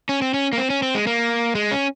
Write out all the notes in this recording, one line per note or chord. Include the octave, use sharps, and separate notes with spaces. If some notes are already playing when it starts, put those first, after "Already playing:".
C#4
C4
C#4
A#3
C4
C#4
C4
G#3
A#3
G#3
C#4